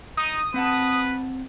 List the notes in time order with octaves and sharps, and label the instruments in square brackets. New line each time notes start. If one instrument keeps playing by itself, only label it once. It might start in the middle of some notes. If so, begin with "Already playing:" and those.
[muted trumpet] D#4 [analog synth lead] D#6
[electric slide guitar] C4 F#5 A5 [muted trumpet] B4